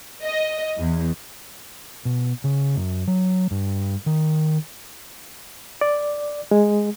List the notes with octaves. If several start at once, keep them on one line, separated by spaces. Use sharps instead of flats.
D#5
E2
B2
C#3
F#2
F#3
G2
D#3
D5
G#3